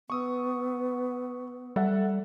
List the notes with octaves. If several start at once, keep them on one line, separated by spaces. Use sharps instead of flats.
B3 C#6 D#6 E6
G3 A4 E5 F#5